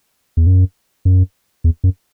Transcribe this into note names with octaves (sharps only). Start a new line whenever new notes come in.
E2
F#2
F#2
E2
F#2